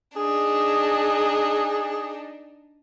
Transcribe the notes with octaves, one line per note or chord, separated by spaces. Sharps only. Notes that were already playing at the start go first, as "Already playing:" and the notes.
D4 D#4 G#4